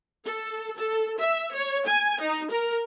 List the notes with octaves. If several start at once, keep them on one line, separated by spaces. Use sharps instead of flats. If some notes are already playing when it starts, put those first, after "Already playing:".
A4
A4
E5
C#5
G#5
D#4
A#4